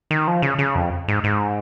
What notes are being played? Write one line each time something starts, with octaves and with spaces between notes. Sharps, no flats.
D#3
F3
C#3
C#3
F2
G#2
G#2